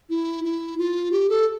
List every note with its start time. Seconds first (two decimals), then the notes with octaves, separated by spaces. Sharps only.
0.10 E4
0.44 E4
0.78 F4
1.12 G4
1.30 A4